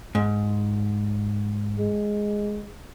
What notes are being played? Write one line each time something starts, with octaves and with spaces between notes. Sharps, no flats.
G#2
G#3